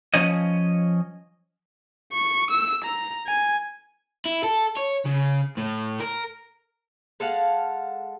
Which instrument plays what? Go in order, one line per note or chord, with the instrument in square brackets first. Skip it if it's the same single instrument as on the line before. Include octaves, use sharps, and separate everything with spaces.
[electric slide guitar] F3 C#4 C#5 D#5
[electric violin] C#6
E6
A#5
G#5
[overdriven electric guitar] E4
A4
C#5
C#3
A2
A#4
[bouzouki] G#3 A4 F5 F#5